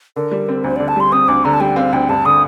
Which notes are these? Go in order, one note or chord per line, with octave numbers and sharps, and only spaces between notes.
D3 A#4
G3
C4
D2 C5
D3 D5
A5
G3 C6
C4 D#6
D2 D6
D3 A#5
A5
G3 G5
C4 F5
D2 G5
G2 A5
D3 D#6